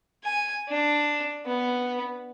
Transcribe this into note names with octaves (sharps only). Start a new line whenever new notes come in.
G#5
D4
B3